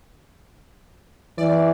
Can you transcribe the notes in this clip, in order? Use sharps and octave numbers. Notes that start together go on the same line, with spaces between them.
E3 D5